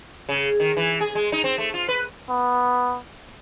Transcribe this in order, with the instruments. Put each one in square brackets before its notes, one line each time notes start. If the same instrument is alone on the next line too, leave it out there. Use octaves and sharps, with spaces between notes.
[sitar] C#3
D#3
E3
G#4
G#3
D#4
C4
A3
F4
B4
[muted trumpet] B3